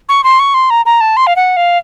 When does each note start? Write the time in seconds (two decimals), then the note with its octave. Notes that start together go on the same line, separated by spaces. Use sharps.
0.09 C#6
0.24 C6
0.39 C#6
0.54 C6
0.70 A#5
0.86 A#5
1.01 A5
1.17 C6
1.27 F5
1.36 F#5
1.57 F5